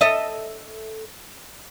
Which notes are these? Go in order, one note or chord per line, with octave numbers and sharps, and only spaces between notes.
A4 D#5 E5